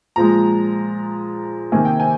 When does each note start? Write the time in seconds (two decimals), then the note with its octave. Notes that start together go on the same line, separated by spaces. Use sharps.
0.16 A#2 F3 G#3 A#5
1.72 C3 D#3 A#3 G#5
1.85 G5
2.00 G#5